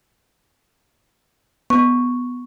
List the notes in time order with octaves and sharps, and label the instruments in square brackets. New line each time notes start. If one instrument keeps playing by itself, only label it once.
[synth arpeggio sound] B3 [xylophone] C#6